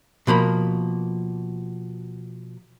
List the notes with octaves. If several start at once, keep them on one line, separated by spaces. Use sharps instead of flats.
B2 F3 A#3 B5